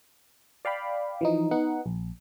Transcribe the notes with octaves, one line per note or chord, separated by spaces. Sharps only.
D5 F5 G5 B5
E3 F3 D#4
B3 D#4 F#5
A#1